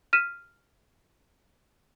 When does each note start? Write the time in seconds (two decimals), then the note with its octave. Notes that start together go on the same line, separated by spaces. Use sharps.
0.13 F6 B6 D#7 E7